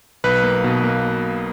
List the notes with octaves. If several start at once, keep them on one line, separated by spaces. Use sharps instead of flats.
B1 B4
A#3
B2
A#3